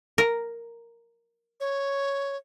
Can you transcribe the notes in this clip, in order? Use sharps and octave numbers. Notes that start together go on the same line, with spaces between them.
A#4
C#5